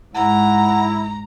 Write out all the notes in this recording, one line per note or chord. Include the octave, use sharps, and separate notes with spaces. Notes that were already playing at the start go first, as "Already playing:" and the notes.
G#2 E4 F#5 A#5